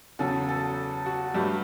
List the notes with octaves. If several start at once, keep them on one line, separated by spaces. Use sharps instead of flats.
E2 C#3 F#3 A4
A4
F#4
G2 F#3 A3 G4